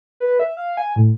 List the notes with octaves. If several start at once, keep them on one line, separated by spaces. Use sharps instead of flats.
B4
E5
F5
G#5
A2